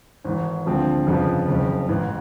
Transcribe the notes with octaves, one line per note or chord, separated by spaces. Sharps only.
G#1 G#2 E3
D2 D3 F3 G#3 C4
G1 F2 C#3 F3
F#1 F2 C#3
A1 G#2 E3